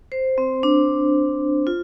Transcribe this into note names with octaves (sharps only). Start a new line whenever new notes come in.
C5
C4
D4
F4